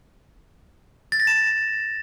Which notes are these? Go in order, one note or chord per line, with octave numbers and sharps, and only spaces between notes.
A6
A#6
E7